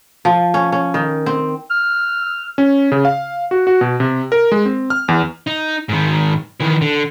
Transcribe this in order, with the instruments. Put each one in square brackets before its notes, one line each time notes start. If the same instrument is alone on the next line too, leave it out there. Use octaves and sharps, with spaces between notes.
[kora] F3
C#4
C#4
D#3
C4
[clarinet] F6
[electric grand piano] C#4
C#3
F5
F#4
F#4
B2
C3
A#4
G#3
C4
F6
E2
[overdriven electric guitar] D#4
G#2 D#3
D#3 E3
D3